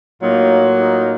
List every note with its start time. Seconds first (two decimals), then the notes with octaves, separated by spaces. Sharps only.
0.21 A2 F#3 A#3 D#4 F4
0.80 D#4 F4